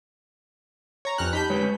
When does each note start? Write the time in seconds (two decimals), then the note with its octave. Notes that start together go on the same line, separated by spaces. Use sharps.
1.05 C#5 A#5
1.18 F2 B3 C#4 G4 F6 F#6
1.33 D#4 G4 A5 B5 G6 B6
1.50 G#3 B4 C#5
1.62 C#4